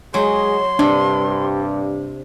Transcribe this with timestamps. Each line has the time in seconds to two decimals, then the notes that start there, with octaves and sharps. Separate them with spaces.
0.14 F#3 G#3 G#4 C6
0.79 G2 C3 D4